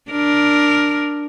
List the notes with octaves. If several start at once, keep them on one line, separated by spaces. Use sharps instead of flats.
D4 A#4